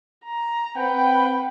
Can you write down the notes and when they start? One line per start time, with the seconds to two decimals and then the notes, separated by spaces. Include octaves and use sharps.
0.24 A#5
0.77 C4 B4 F#5 G5